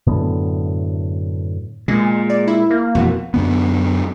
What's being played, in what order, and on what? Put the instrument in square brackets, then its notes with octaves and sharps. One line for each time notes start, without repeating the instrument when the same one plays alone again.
[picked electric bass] F#2 A2 D3 B3
[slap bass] A#2 [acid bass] G#3
[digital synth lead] D5
E4
[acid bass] A#3
[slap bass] F2 B2 E3 [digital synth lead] F#4
[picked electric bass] F#2 D3 B3